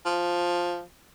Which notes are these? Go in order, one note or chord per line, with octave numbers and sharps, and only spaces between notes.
F3